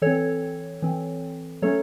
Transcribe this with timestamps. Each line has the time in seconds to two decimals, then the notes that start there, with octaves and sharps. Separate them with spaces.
0.02 E3 C4 A4 C#5
0.82 E3 C4
1.62 F#3 A3 C#4 A4 C#5